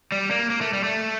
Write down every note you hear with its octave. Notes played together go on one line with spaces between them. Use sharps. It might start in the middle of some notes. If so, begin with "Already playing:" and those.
G3
A#3
A#3
A3
G3
A3